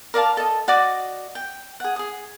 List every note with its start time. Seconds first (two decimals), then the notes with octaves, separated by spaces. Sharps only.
0.14 A#4 D5 F5 A5
0.37 A4 D#5
0.68 F#4 D5 D#5 D6
1.35 G5
1.80 G#4 F#5
1.96 G#4 D#6